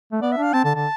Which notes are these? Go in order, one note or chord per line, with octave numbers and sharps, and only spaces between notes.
A3
B3 D5
E5
D4
F5
C4 A5
D3 A5
D3 A5